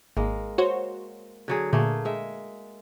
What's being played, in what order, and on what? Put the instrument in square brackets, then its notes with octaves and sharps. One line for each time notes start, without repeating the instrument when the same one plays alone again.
[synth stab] G#1 [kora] G#3 A#3
[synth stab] F#4 C5 C#5
[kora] D3 F#3 G#4
[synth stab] A#2 D3 [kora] A3 A#3 G#4
[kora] G#3 E5